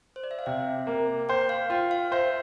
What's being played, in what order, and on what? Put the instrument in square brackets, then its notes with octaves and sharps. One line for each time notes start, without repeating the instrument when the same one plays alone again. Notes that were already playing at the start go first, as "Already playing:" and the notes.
[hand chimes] C5
D5
E5
F5
[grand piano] C3 [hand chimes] G5
[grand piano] A#3
[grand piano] C5 [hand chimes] G5
[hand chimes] F5
[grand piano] F4 [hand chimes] G5
[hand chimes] F5
[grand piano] C5 [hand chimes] E5